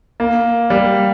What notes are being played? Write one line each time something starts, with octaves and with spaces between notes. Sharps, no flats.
A#3
G3